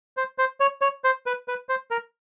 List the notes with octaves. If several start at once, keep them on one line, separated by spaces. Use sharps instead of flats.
C5
C5
C#5
C#5
C5
B4
B4
C5
A#4